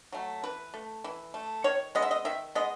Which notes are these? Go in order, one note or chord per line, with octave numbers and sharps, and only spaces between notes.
F#3 A3
E3 B4
A3
E3
A3
D#3 C#5
G#3 B3 D#5
E5
D#5
D#3 E5
G#3 B3 D#5